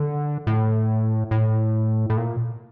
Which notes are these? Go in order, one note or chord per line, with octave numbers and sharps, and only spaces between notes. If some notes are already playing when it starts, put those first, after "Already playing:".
Already playing: D3
A2
A2
A2
A#2